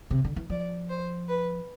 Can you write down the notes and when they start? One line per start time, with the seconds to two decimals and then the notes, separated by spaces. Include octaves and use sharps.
0.11 C3
0.24 D3
0.36 E3
0.50 F3 D5
0.89 C5
1.28 B4